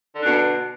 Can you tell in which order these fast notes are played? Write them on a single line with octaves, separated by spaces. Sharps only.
D3 D4 B2